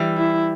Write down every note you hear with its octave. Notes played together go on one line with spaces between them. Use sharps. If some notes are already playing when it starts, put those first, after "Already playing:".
Already playing: E3 G3
E4